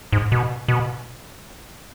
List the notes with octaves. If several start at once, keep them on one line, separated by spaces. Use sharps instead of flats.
G#2
B2
B2